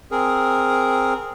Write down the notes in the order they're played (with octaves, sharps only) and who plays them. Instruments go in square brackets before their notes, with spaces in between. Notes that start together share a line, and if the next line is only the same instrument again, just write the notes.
[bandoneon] C4 G#4 A#4